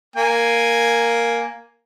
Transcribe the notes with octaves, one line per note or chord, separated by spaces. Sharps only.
A#3 G#5